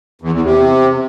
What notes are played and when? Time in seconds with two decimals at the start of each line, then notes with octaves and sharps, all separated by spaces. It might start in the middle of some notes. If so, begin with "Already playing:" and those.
0.22 E2
0.33 E2
0.45 C3